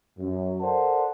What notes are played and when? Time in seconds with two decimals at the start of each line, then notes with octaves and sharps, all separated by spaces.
0.19 F#2
0.61 A4 A#4 C5 D5 F#5 A5